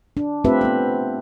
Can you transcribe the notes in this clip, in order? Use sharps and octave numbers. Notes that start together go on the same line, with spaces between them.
D4
A3 C4 F4 G4 B4 E5
B3 C5